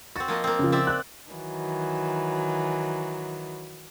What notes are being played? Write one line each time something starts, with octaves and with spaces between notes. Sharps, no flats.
C4 F#4 A6
F3 A#3 D#5
A#3 C4
C#3 F3
C4 D5 E5
F#6
D#3 E3 F#3